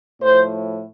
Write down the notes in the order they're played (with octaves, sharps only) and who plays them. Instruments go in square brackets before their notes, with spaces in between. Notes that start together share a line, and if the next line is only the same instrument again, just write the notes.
[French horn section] A2 F3 C5